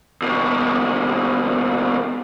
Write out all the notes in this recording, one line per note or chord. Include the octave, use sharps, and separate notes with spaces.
D#2 B2